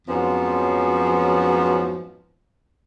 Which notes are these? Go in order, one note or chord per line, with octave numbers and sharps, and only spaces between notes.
F2 G#2 F3 F#3 B3 C#4